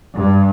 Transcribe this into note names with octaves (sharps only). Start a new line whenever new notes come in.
G2